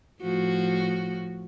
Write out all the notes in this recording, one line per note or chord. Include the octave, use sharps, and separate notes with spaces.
A2 F3 F#4